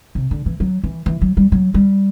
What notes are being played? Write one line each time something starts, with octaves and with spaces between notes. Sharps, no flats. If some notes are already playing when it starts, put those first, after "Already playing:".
C3
D3
E3
F#3
E3
E3
F#3
G3
F#3
G3